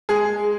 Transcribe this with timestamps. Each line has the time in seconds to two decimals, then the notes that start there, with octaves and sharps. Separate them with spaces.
0.09 G#3 G#4